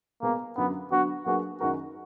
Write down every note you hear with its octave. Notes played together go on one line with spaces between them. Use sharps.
B2 G#3 A#3 B3
F#2 D3 F#3 B3
D3 F#3 B3 D4 F#4
F#3 A#3 D4 F#4 G#4 B4
F#2 D#3 G#3 D#4 F#4 A#4